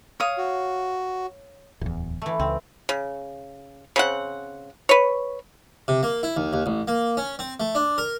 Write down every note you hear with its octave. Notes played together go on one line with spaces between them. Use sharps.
C#5 F5 D#6
F#4
D1 E2
E3 A3
C#2 C4
C#3
C#3 C4 F#5
B4 C#5
C3
A#3
E4
D#2
D#2
A1
A#3
C#4
C4
A3
D4
A#4